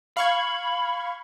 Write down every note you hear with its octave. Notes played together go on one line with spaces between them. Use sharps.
F5 B5 C#6 G#6